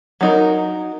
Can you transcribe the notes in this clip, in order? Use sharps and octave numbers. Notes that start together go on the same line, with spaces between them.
F#3 D#4 A#4